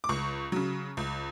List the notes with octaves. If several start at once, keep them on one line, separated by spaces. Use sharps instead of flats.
D6
C#2 C#6
C#3 F#3
C#2